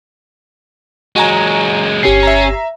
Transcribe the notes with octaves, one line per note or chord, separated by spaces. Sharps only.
F#3 G#3 F#4 G#5 A#5
G1 C#4 G4 C7
E5 A#5